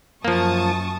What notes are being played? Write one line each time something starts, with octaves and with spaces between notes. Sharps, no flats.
F#2 F3 A#3 A5 C#6 D#6